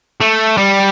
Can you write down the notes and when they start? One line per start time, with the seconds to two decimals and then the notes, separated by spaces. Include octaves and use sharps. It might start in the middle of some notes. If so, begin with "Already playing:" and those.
0.21 A3
0.57 G3